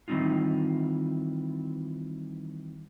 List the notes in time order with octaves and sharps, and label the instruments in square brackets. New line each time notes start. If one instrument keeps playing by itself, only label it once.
[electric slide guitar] D#3 E3 G3 C4 D#4 F4